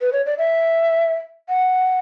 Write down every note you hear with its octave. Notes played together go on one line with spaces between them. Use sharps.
B4
C#5
D5
E5
F#5